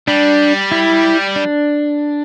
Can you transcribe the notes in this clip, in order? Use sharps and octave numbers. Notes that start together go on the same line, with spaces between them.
G3 D4
E4
D4